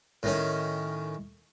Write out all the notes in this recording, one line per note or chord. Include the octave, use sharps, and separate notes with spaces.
A2 D#3 C#4